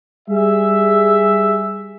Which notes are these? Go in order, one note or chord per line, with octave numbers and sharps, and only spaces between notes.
G3 G#4 E5